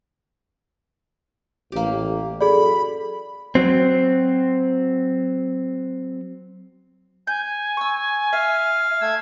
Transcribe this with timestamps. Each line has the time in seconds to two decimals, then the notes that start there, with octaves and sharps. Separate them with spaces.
1.72 A1 A#3 G4
2.41 F#2 F#4 G#4 A4 D5 B5
3.55 F#3 C4
7.27 G#5 G6
7.77 C#6 E6
8.33 E5 F5
9.01 A3 E6 G#6